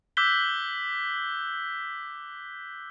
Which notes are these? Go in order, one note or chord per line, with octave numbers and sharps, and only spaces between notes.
D6 E6 F#6 G6 B6 G7